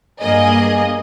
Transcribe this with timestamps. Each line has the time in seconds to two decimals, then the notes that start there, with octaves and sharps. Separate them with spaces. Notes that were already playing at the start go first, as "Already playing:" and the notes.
0.20 G2 A#3 G#4 D#5